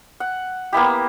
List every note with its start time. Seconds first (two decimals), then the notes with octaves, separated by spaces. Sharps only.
0.20 F#5
0.73 A#3 B3 E4 G4